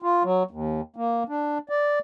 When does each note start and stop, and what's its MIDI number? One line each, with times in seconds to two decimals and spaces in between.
0.02 0.23 65
0.24 0.43 54
0.51 0.81 39
0.96 1.23 58
1.29 1.58 62
1.69 1.99 74